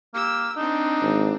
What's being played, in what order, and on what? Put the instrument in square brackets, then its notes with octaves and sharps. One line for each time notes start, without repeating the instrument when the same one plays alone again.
[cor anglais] A#3 [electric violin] G4 E6
[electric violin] C4 D4 [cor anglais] D#4
[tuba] G#1